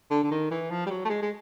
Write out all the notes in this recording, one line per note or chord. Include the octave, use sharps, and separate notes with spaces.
D3
D3
D#3
E3
F3
G3
F#3
A3
G#3
G#3